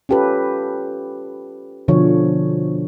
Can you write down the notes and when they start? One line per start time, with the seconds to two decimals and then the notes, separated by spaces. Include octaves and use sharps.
0.09 C#4 F4 G4 A4 B4
1.88 B2 D3 F3 C#5